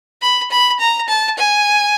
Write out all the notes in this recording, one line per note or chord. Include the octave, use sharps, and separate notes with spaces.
B5
B5
A#5
A5
G#5